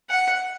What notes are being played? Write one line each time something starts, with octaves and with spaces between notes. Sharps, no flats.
F#5